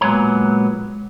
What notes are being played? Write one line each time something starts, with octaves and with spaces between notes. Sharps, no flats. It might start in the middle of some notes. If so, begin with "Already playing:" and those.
A#2 F#3 G#3 B3 C#5 A#5